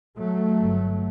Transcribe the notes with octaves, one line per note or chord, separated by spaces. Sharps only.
F#3 A3
G1 G2